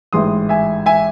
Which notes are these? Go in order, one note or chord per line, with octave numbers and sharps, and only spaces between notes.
A1 G#2 E3 G#3 C6 D#6
E5 G#5
E5 G#5